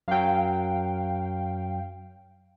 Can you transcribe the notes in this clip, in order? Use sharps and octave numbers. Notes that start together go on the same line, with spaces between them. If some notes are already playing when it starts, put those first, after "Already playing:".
F#2 F#3 F5 G5